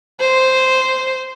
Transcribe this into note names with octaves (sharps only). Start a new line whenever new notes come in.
C5